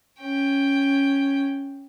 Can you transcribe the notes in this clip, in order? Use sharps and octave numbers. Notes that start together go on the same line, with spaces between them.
C#4 G5